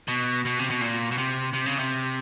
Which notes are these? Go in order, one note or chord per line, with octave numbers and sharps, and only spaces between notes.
B2
B2
C3
B2
A#2
B2
C3
C3
C#3
C3